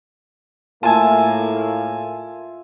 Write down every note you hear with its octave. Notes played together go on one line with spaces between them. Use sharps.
A2 A#3 F4 E5 G#5 A5